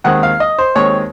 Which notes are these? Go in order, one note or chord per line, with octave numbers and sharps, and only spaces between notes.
D#2 D#3 G#3 C4 F#5
F5
D#5
C5
D#2 D#3 G#3 C4 C#5